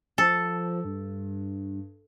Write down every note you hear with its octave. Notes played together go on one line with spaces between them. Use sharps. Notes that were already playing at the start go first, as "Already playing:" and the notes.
F3 A4
G2